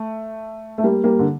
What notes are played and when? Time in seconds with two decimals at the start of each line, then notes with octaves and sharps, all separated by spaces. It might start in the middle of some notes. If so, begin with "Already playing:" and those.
Already playing: A3
0.78 A3
0.84 G3 A#3
1.04 G3 A#3
1.19 D3